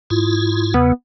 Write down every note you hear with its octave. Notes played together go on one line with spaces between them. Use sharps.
G#2 E4 F4
E2 C#3 B3